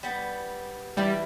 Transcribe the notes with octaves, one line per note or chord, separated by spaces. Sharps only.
G3 B3
E3 G3 E4 A5